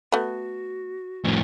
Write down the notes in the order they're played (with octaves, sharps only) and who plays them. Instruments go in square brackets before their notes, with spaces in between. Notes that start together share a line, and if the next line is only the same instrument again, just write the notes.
[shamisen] A3 B3 [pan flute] F#4
[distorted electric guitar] F2 A2